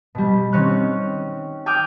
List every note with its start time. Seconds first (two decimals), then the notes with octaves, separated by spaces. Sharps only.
0.15 B2 G3
0.52 D#3 C4 C#4 C#6 F#6
1.66 G5 G#5 D6 D#6 F6 G6